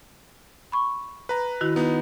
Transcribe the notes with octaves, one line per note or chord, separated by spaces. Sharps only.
B5 C#6
B4 A#5
D#3 E4 F#4
B3 D#4